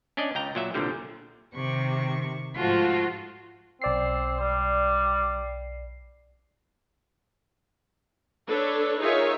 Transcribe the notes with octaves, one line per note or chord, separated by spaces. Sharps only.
C#4 D4 D5 D#5
C#2 G5 A#5
A#2 F#3 E5
C2 A#2 D3 G3
C3 D#3 C#6
G#2 F3 A3 F4 F#4
B1 C4 D5 C7
G3
D4 A4 B4 C#5
D#4 F4 G#4 A#4 C#5 E5